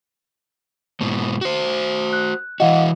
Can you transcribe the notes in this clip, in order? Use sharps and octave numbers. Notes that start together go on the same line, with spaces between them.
G#2 B2
F#4 C5
F#6
E3 F#4 D#5 F5 F#5